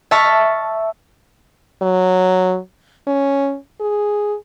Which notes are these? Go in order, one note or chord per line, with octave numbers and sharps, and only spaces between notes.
E5 A5 C#6 F6 A#6 C#7
F#3
C#4
G#4